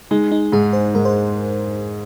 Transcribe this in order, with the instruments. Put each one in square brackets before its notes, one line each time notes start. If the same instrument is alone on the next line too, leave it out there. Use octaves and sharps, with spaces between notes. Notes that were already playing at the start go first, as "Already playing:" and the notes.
[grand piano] G#3 [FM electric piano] D#4
[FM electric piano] D#4
[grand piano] G#2 [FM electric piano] G#4
[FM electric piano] C5
[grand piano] G#2 [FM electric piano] A#4
[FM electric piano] C5